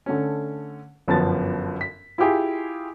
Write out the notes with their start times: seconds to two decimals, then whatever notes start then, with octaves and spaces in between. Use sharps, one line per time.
0.06 D3 A3 C#4
1.08 G1 F#2 F3 B3 A5 A6
1.81 B6
2.18 E4 F4 G4 G#4